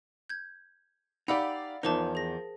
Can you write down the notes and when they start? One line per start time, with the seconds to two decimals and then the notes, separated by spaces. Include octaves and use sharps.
0.30 G6 G#6
1.28 D#4 G4 D5 F5 F#5 B5 E6
1.83 E2 F3 D#4 A#4 C5 A5
2.15 G#4 A#6